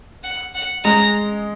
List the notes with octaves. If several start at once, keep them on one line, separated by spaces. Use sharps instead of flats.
F#5
F#5
G#3 A#5